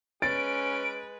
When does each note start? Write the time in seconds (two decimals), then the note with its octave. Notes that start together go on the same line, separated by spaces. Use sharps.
0.22 G#3 C#4 B4 A6 D7